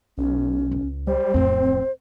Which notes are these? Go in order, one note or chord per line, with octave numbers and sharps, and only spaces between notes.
B1 C#4
C#2
G3 C5
D1 F2 C4